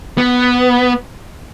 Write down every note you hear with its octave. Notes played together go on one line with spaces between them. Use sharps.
B3